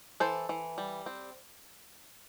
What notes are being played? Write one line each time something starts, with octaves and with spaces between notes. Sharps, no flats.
E3 A4 C5
E3
G3
C4